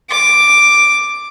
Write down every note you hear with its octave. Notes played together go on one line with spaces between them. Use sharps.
D6